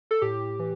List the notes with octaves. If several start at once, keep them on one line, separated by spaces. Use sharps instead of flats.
A4
A2 G4
E3